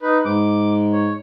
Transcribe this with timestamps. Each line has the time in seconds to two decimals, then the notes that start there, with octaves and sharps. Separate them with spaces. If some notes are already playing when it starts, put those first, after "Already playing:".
0.01 D#4 B4
0.25 G#2 D6
0.93 C#5